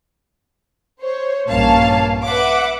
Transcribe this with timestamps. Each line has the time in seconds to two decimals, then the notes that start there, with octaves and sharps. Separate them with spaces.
1.00 C5 C#5
1.48 A#1 G2 A#3 C#4 F5 A5
2.24 B4 E5 F#5 D6